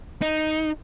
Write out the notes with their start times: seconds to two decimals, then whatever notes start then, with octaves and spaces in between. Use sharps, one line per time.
0.22 D#4